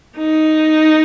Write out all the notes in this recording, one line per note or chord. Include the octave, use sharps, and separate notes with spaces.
D#4